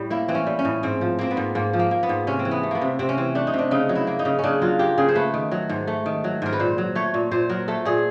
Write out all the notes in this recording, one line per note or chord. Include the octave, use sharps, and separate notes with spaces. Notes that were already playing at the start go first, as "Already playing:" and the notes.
Already playing: A2 G3 G4
A#3 E4
E3 C4
C#4
G3
C#4
A2
G#2 C4
F3
A#3 C4
B3
G#2
G#2 A#3
F3
A#3
A#3
B3
G#2
C3 C#4
C4
E3
B3
A3
A#3 B3
C3
C3 C4
C#4
E3 C4
A3 D4
D#4
C3
D4
C#3 D#4
F#3
E4
A#3
D#4
C#3
C#3 C#4 D4
F#3 F4
A#3 G4
C#3 G#4
C5
A3 B4
D#3
F#3
G#2
A3
D#3
F#3
G#2 A#4
B4
A#2 C5
F#3
A3 C#5
A#2
A#2 C5
F#3 A#4
A3 A4
A#2 G#4